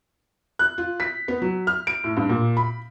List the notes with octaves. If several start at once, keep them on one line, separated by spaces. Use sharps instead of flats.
F#6
F4
B6
B3
F#3
F6
D7
A2
G2
A#2
B5